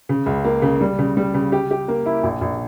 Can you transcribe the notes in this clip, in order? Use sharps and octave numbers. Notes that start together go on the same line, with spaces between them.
C#3
C#2
A#3
C#3
G3
C#3
G3
C#3
G4
G4
A#3
E4
A#1
A#1